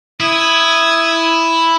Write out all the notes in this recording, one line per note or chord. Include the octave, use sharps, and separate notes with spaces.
E4 D#6 G#6